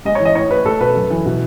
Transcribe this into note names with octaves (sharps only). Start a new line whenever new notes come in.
G#3 D#5
C#5
E3
D#5
A2 C#5
A2 B4
A3 A4
B2 B4
F#2
E3
B2